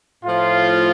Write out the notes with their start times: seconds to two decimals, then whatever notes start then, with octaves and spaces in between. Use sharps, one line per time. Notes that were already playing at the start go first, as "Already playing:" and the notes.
0.24 A2 F3 F4